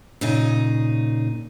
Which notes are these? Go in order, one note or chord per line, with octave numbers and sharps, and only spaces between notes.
A#2 C#3 D#4